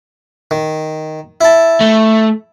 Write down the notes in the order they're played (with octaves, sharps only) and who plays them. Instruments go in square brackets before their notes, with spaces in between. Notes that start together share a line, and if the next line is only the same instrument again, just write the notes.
[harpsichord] D#3
E4 A5
[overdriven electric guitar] A3